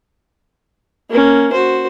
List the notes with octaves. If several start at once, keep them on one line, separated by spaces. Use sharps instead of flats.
A#3 C#4
F#4 C5